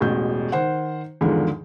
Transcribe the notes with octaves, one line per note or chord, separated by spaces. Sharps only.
E1 A1 B2 G6
D#3 C5 F#5
E2 G#2 D3 D#3 F3